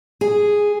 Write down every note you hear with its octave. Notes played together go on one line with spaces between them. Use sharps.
G#4